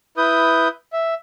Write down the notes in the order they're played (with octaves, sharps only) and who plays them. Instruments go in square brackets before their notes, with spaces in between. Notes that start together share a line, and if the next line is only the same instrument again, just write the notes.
[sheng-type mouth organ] E4 B4 D#6 G6
E5